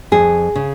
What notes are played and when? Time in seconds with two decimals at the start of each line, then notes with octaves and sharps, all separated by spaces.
0.12 F2 G#4
0.55 C#3